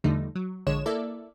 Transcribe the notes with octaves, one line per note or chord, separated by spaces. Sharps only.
E2 D3 F3 G3 A3 D#4
F#3
A#1 D3 G#3 C#5 E7
A#3 E4 A4 D5 E5